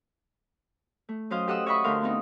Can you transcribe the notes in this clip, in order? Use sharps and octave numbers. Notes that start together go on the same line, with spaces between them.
A3
F#3 C#4 F#4 C5 D#5 F5
G4 A4 D#5 F#5 D#6 E6
C#5 D#5 E5 F#5 B5 C#6
D2 A3 A4 A#4 F5 C6
B3 C4 D#4